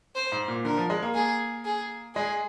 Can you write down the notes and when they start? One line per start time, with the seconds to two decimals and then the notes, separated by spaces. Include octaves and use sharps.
0.15 C5
0.32 G#2
0.48 A#2
0.65 D3 A#4
0.77 F3
0.90 G#3
1.02 A#3
1.15 G#4
1.65 G#4
2.15 G#3 G#4